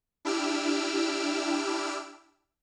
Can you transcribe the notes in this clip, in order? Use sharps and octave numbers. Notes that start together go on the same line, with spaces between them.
D4 E4 G4 E6 F6 D7